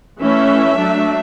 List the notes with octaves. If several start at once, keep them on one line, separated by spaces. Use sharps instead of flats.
E3 A3 C#4 E5
F#3 A3 D4